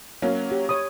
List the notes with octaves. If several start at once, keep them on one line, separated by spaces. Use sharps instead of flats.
F#3 A#3 C#4
G4
C#5 B5 D#6